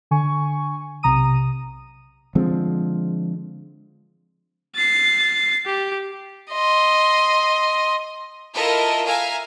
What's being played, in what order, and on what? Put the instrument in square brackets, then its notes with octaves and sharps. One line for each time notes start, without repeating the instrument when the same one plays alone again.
[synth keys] D3 G#5 C#6
B1 C3 A#5 D#6 D#7
[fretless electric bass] D3 F3 G#3 C4
[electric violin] A6 C7
G4
[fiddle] D#5 C6
[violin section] E4 F4 A4 A#4 D#5 E5
E5 F5 G#5 A#5